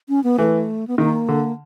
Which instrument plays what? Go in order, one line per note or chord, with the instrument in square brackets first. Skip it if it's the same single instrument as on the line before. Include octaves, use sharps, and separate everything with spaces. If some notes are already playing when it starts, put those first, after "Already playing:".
[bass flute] C#4
B3
[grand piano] E3 [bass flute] A3
[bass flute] B3
[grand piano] D#3 [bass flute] A#3
[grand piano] D3